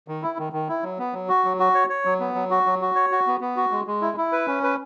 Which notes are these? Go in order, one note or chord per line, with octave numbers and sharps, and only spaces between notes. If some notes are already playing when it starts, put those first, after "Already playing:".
D#3
E4
D#3
D#3
E4
F#3
B3
F#3
F#4
F#3
F#4
C#5
C#5
F#3
B3
F#3
F#4
F#3
F#4
C#5
F#4
B3
B3
F#4
G#3
G#3
E4
E4
B4
C#4
B4